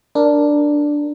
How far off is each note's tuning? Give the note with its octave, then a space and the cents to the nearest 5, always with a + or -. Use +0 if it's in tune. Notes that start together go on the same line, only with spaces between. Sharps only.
D4 +0 A#4 +0